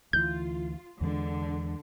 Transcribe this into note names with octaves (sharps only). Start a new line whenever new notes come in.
D2 E3 F4 G6
E2 D3 E3 G#3